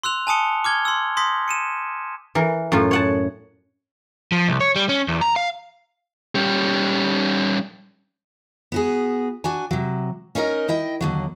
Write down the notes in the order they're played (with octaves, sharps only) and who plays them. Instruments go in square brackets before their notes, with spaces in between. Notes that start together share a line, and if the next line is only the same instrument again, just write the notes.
[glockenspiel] C6 E6 F#6 F7
G#5 A5 D#6 C#7 G7
D6 F6 G#6 G7
C6 E6
C6 D#6 G6 A#6 B6
C#7 D#7 E7
[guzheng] E3 A#4
F#2 A2 F4
C#5 F#5 A5
[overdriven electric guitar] F3
C2
C#5
G3
C#4
E2
A#5
F5
[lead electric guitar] G3 C#4
[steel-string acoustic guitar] B3 F#4 G#4
D4 F#4 G#5
C3 F#3
C#4 D#4 E4 A#4 D#5
E4 D#5 G5
D#2 D3 F#3